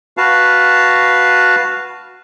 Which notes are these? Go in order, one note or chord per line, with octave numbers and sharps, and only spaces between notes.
F#4 B4 F5 A5